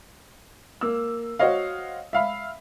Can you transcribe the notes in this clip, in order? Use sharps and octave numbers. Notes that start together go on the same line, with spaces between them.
A#3 E6
F#4 C5 C#5 D#5 F5
E5 F5 B5